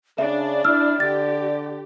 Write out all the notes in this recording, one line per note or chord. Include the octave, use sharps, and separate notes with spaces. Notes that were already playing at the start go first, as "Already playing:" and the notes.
C#3 D4 D5 E5
E4 E6 F6
D3 G4 D5 A6